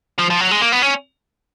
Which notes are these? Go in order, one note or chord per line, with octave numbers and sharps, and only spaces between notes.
F3
F3
F#3
G#3
A#3
B3
C#4